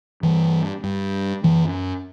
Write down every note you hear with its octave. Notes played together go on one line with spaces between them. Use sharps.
G2 E3
G2
F#2 E3